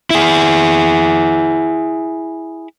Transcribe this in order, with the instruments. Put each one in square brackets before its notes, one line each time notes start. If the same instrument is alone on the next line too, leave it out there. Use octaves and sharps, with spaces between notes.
[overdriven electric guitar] E4 G#4